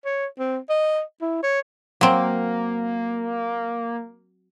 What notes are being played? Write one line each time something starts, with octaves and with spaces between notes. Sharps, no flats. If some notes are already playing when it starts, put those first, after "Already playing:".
C#5
C4
D#5
E4
C#5
F#3 A#3 C4